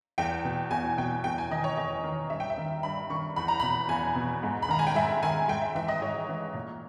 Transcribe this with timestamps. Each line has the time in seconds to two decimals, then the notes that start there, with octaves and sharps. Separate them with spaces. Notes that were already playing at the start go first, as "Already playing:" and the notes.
0.18 E2 G5
0.44 B2
0.71 E2 G#5
0.98 B2 G5
1.24 E2 G5
1.38 G#5
1.51 D#3 D#5
1.64 C#5
1.77 E2 D#5
2.03 D#3
2.30 G2 E5
2.40 G5
2.50 E5
2.57 D#3
2.83 G2 B5
3.10 D#3 C#6
3.36 E2 B5
3.48 A#5
3.60 B2 B5
3.89 E2 G#5
4.15 B2
4.43 G#2
4.62 B5
4.69 D#3 A#5
4.79 G#5
4.87 G5
4.95 G#2 E5
5.23 D#3 G#5
5.48 G#2 G5
5.61 E5
5.75 E3 E5
5.88 D#5
6.02 G#2 C#5
6.29 E3
6.54 A#2